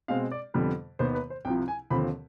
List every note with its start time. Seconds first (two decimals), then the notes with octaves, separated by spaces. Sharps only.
0.08 B2 G#3 C4 F5
0.31 D5
0.54 F2 D3 G3 B3 B4
0.99 D#2 D#3 B3 C5
1.15 B4
1.30 C5
1.45 C2 C3 F3 G5
1.68 G#5
1.90 D#2 D3 F3 C4 B5